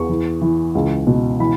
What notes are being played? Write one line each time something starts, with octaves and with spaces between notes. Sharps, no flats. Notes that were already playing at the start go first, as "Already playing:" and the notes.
Already playing: E2 C#6
E3
E3
C#2
B2
E3 B5